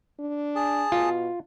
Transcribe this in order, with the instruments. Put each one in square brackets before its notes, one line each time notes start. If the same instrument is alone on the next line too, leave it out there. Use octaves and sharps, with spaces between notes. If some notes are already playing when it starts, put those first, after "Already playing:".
[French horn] D4
[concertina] G#4 A5
[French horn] B2 [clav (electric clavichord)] F4